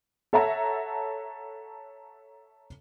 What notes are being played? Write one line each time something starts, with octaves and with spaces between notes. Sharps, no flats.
A4 C#5 E5 F#5 A5 A#5